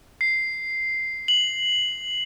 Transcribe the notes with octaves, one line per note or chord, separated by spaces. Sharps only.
C7
F#7